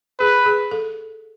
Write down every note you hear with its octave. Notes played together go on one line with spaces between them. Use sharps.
G#4 B4
G#4
A4